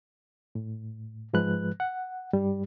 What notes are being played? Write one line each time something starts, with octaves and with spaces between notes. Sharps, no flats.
A2
G#2 F3 G#3 B4 F#6
F#5
G2 G3